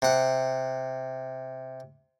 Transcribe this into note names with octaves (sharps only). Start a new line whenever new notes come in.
C3 F#5